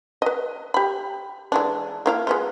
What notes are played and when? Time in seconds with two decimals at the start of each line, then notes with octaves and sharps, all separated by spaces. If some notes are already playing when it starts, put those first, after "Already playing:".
0.22 B4 D#5
0.74 G4 B5
1.52 E3 G#3 D4
2.06 A#3 E4 F5
2.27 G#3 B3 F4